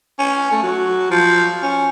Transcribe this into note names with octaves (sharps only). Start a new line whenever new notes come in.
C#4
A3
F#3
F3
C#4